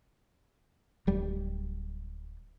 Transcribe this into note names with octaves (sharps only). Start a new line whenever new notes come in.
D1 G3